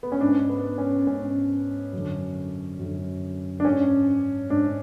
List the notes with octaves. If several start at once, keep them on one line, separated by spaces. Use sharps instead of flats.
B3
C#4
G#2 D4
B3
C#4
G#2 C#4
F#2 D3
F#2 D3
D4
G#2 C#4
G#2 D4